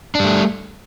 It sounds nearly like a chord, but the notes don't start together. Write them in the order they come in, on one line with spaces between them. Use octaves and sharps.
D4 G3 A3